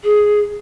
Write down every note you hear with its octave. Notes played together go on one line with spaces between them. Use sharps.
G#4